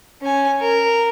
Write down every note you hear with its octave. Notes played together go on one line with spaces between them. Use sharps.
C#4 G#5
A#4